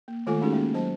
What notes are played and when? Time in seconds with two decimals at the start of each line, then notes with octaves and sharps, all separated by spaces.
0.08 A#3
0.27 D#3 G#3 A3 F4 A4 G#5
0.41 G#3 A3 C#4 D#4 F#4 G#4
0.53 G#3 A#3 C#4 G#4
0.74 F#3 C5 A5